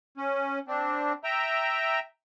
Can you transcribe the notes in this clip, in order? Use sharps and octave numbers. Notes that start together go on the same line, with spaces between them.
C#4
C4 D4
E5 G5 A#5